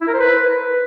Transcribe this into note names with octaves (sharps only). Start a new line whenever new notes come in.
E4
A#4
C5
B4